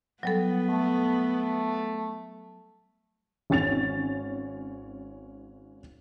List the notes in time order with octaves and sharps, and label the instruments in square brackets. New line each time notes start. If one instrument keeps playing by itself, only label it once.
[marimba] F#3 G3 A4 [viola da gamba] B3
[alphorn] A3
[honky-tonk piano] G#1 C#4 A6 F7